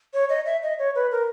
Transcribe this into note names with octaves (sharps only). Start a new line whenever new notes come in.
C#5
D#5
E5
D#5
C#5
B4
A#4